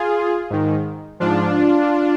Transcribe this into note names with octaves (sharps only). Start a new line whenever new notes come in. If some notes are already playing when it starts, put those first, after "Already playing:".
Already playing: F4 G#4
G#2 D#3
G#2 F3 D4 F4